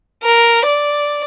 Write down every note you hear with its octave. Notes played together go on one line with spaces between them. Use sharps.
A#4
D5